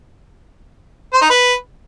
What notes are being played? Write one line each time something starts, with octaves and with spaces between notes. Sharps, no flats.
C5
D#4
B4